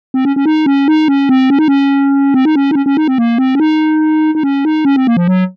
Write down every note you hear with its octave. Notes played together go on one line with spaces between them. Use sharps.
C4
C#4
C#4
D#4
C#4
D#4
C#4
C4
C#4
D#4
C#4
C4
D#4
C#4
D#4
C#4
C#4
D#4
C4
A#3
C4
C#4
D#4
D#4
C#4
D#4
C#4
C4
A#3
F3
F#3